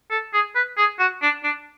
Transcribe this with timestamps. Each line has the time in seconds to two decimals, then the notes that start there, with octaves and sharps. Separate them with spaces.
0.11 A4
0.33 G#4
0.55 B4
0.78 G#4
0.99 F#4
1.22 D4
1.44 D4